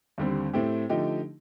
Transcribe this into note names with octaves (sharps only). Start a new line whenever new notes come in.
D#2 D3 G3 C4
A2 A3 C4 G4
D3 F3 A3 D#4 G4